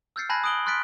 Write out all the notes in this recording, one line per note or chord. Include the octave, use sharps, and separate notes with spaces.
E6 F6 G6 A6 C7 C#7
G#5 A5 B5 F#6 G#6 A#6
D#6 F#6 D7 F#7 G7
C6 F6 F#6 A6 B6 D7